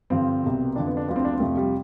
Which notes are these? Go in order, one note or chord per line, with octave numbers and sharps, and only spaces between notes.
G2 D3 F3 C4
C2 B2
F2 D3 F3 D4
B3
D4
D2 D3 F3 D4
C4
D4
C4
F2 C3 F3 A3
G3